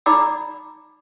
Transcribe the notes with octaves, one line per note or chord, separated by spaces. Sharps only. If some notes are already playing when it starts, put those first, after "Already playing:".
D#4 D5 A#5 B5 D6 E6